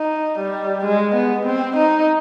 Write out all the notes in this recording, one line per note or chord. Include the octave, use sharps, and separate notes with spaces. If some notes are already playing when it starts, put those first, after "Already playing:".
Already playing: D#4
G3
G#3
B3
C4
D#4